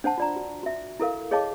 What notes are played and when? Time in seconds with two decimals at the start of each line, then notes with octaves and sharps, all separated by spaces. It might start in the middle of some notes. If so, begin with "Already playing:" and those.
0.04 D4 C5 F#5 A5
0.18 F4 D5 A#5
0.36 F#4
0.63 F#4 E5
1.00 E4 A4 A#4 F5
1.31 G#4 C#5 D#5 F5 A5 D6